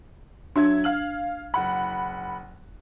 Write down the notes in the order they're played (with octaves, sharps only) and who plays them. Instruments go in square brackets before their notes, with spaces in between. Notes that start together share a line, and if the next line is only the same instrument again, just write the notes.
[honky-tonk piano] F#3 E5 G#6 [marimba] D4
[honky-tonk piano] F5 F6 F#7
F#1 F#5 B5